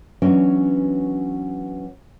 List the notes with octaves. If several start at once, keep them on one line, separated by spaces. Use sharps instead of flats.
E3 F#3 B3 C#4 D4